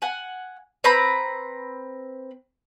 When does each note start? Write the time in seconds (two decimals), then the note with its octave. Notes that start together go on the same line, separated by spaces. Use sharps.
0.02 F#5 G#5
0.84 C4 B4 A#5 B5